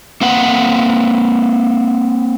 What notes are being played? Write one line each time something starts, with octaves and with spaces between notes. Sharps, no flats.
A#3 C4 F#5